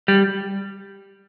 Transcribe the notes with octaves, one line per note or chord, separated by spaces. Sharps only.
G3